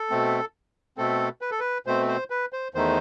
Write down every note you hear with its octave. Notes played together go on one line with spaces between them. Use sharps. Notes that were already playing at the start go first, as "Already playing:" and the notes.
Already playing: A4
B2 A3 C4
B2 A3 C4 A4
B4
A4
B4
B2 A3 C4 C5
C5
B4
C5
E2 D#3 A3 D#4 C5